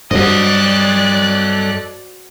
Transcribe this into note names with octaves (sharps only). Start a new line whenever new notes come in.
G2 F#3 F#4 A4 C5 D5 D#5 F#6